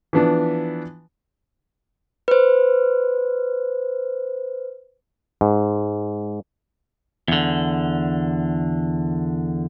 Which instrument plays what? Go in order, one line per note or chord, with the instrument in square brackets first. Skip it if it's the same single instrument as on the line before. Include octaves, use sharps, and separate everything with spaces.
[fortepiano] E3 F3 B3 D4
[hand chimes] B4 C5
[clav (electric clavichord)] G#2
[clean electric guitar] E2 D3